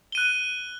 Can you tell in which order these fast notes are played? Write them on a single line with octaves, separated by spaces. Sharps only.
G7 D#7 F#6